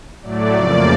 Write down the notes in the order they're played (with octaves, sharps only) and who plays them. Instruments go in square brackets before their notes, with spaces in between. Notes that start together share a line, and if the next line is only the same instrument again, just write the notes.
[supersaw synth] A2 F#3 A3 D5
F2 C#3 F3 A#3